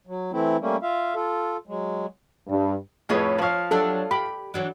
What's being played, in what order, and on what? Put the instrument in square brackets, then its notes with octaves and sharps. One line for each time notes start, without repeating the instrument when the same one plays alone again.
[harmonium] F#3
E3 A3 C4 E4
G3 A3 A#3 C#4
F4 E5 F5
F4 A4
F#3 G#3
[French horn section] G2
[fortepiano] F2 A2 B4 [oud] D#4 G#4 C#5
[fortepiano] F3 F5 [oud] B4 C#5
[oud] F#3 D4 G4 [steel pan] A4
[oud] G4 [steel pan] B5
[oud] E3 F#3 D4